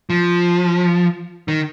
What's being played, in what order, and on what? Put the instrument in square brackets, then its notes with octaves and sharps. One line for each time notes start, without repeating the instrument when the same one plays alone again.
[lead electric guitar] F3
D#3